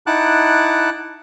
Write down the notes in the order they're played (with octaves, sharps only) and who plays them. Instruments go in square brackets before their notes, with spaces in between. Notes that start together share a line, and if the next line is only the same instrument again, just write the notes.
[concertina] D#4 E4 F#5 A5 D6 F#6